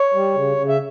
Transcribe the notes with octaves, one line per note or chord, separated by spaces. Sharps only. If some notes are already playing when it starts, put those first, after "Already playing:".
Already playing: C#5
G3
C#3
C#3
E5